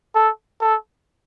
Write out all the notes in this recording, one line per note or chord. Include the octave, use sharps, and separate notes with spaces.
A4
A4